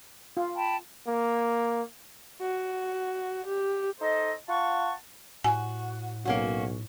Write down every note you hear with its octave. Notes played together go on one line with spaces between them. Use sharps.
F4
G5 A5 B5
A#3
F#4
G4
D#4 A4 C5 D#5
F4 F#5 A5 C#6
A2 F#4 G#5
B1 A#3 C#4 F#4